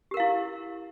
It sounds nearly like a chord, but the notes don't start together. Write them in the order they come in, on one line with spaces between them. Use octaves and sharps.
G4 A#4 F5 E4